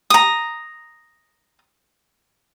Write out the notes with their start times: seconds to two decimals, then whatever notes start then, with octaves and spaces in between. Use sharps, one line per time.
0.10 A#5 D#6